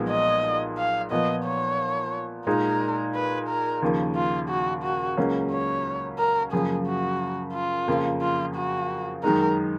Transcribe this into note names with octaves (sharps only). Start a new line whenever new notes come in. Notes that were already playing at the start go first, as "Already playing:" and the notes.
Already playing: B1 A#2 F3 G#3 B3
D#5
F5
A#2 F3 B3 D#5
C#5
A#2 G#3 D#4 A#4
B4
A#4
D#2 C#3 F3 A#3
F4
F#4
F#4
C#2 C#3 F#3 A#3 C#4
C#5
A#4
F#2 C#3 F3 A#3 G#4
F#4
F4
F2 C#3 F3 A#3
F4
F#4
F#2 D#3 G#3 D#4 A#4